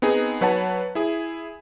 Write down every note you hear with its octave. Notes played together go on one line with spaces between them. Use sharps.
B3 C4 D#4 G#4
F#3 B4 C#5 F#5 A5
E4 G#4